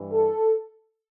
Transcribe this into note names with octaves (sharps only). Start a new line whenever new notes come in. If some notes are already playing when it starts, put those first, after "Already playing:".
Already playing: G2 E3
A4